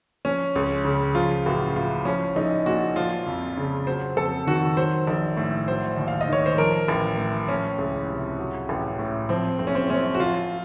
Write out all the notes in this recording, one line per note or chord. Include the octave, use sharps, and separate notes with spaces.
F3 C#4
C#2
C#3
F3 F4
A1 F#4
A2 F4
F3 C#4
A#1 D#4
A#2 F#4
F3 F4
F2
C#3
F#3 C5
F2 A4
D#3 F#4
F#3 C5
A#1
A2
F#3 C5
D#2
F5
D#5
D#3 C#5
C5
F3 A#4
A1
A2
F3 C#4
C#2
C3
F#3
A1
A2
F3 C4
F#1 C4
C#4
C4
F#2 C#4
F#4
F3 F4